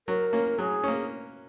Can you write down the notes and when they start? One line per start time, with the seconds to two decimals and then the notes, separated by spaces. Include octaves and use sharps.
0.07 F#3 A#4
0.33 A#3 C#4
0.59 F#3 G#4
0.84 A#3 C#4